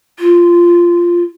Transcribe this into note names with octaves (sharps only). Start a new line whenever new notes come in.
F4